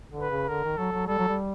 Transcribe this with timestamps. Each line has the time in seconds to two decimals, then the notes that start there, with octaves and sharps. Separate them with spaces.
0.11 D3
0.20 B4
0.30 C#3
0.49 D3 A#4
0.64 D#3
0.78 F#3 A4
0.92 F#3
1.07 G3 A4
1.18 F#3
1.29 G3